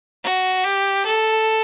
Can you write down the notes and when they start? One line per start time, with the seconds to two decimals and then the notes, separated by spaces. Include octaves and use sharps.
0.24 F#4
0.64 G4
1.05 A4